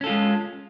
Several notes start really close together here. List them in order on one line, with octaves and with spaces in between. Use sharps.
C#4 A4 F4 G#3